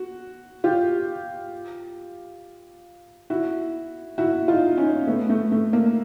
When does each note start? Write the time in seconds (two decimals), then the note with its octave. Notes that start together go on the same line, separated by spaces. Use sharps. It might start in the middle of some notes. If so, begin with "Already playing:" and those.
Already playing: F#4
0.64 F4 G4
3.30 E4 F#4
4.18 E4 F#4
4.48 D#4 F4
4.78 C#4 D#4
5.07 A3 B3
5.29 A3
5.52 A3
5.73 A#3